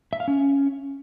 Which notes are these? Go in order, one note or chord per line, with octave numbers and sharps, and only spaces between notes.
E5
F5
C#4